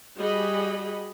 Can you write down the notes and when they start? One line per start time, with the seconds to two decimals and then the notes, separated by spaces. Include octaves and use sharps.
0.17 G3 F#4 G#4 D#5 B5